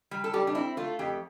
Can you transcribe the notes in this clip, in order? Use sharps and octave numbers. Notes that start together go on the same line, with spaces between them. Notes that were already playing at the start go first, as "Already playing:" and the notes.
G3
A4
G3 G4
D4
C4 E4
A3 F4
F2 G4